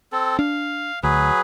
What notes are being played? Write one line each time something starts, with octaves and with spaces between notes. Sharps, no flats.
C4 A4
D4 F5
D2 F#3 G#4 B4